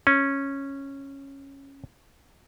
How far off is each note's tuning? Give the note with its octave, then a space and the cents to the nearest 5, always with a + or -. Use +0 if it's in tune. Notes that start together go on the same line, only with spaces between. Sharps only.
C#4 -10